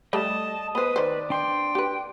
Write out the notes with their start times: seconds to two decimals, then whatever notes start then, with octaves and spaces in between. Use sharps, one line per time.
0.13 G3 A3 D#5 A5
0.75 B3 B4 C5 D#6
0.96 D#3 C5 D5
1.30 D4 G5 C6
1.75 G4 B4